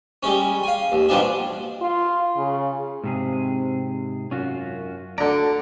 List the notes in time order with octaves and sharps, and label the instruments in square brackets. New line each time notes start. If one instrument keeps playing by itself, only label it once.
[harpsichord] G3 G#3 C#4
F5 G#5
D#2
B2 F3 G3 D4 G#4
[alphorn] F4
C#3
[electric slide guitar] G#2 C3 G#4 [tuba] C4
[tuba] F#2 [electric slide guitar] C#4 F4 F#4
[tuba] D2 [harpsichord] D3 A#5 [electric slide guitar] D5